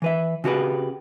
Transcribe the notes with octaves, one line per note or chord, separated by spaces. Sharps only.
E3 B4 E5
C#3 F#4 G4 B4